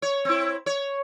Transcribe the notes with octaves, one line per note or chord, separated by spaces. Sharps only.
C#5
C4 E4
C#5